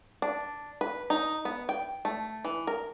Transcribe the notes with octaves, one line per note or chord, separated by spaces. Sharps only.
D4
B4
D#4
B3
G5
A3
E3
A#4